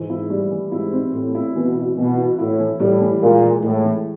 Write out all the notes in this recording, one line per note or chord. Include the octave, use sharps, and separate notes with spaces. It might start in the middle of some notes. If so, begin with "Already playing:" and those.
Already playing: G#2 E3
E4
G3
E3
G#2 E4
C4
A2 C4
E4
B2 E3
E4
B2 E3
E4
A2 E4
E3
A2 G3
E3
A#2 G#3
E3
A2 G#3
E3